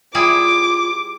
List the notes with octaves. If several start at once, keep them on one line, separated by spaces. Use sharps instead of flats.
G3 E4 F4 G#4 D6